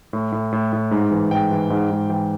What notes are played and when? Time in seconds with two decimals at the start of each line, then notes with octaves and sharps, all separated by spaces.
0.13 A2
0.32 A2
0.52 A2
0.73 A2
0.91 G#2
1.11 E3
1.31 G#2 G5
1.51 E3
1.70 G#2
1.91 G#2
2.09 E3 G5